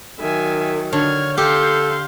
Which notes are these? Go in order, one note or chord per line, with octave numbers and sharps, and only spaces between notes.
D#3 F#3 E5 G#5
D3 C#5 F6 G#6
G4 A4 F5 C6 G6